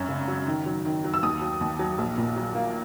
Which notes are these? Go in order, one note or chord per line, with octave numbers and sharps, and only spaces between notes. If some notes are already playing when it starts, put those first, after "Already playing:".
Already playing: G#1 F#2 C#4
C#3
F#3
D#3
F#3
D#3
F#3
E6
D#2 D#6
F#3
D#2
F#3
A#1
A#2
F#3
A#3